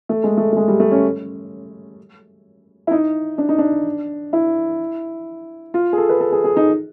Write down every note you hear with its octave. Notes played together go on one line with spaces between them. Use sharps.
A3
G#3
A3
A3
G#3
G3
A3
C#4
E4
D#4
D4
D#4
D4
E4
F4
G#4
A4
B4
A4
G#4
G#4
D#4